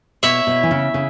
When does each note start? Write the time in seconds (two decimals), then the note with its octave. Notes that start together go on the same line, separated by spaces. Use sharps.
0.23 B2 E4 C#5 E5
0.47 B2
0.63 E3
0.71 C#3
0.94 C#3